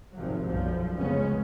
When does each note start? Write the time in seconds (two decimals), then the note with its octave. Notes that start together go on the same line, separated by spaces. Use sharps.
0.14 G#1 C3 F3 F#3
0.45 B1 F#2 F3 G3
0.95 F1 C#2 C#3 G#3 B3 C#4